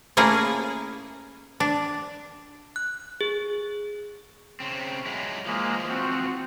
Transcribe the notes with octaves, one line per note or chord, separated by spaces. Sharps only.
A3 A#3 C#4 E4 F4 G#4
D4
F#6
G#4
C#3 C4
F#3 G#3 E4
E3 F3 G#3 A#3
C4 F#4